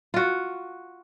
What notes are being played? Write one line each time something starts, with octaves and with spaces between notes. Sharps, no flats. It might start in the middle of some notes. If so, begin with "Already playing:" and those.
F4 F#4